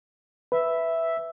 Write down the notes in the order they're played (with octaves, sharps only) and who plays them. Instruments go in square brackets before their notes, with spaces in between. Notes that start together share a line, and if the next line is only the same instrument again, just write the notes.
[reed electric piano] B4 [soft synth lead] E5